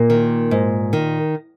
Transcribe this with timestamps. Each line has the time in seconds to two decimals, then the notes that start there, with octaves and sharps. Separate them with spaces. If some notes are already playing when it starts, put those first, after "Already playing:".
Already playing: A#2 A#3
0.10 D#3
0.51 G#2
0.93 D#3